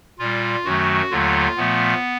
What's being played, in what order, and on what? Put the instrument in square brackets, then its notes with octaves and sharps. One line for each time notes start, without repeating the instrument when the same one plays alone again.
[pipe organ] A#2 G3 F4
F#2 D#3 F#3 A3 F#4
D#2 D3 F#3 A3 F4
A#2 F3 A3 B3